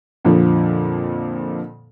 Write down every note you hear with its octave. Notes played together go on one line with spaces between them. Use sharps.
F2 A#2 D3 F3